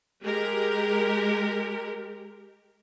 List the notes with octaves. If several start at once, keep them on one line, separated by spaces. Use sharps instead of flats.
G#3 G4 A#4